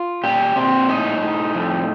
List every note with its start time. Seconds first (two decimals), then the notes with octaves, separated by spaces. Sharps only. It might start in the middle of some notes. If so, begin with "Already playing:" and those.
Already playing: F4
0.23 A#2 G4
0.56 A#2 C4
0.89 A2 D#4
1.22 A2
1.55 F2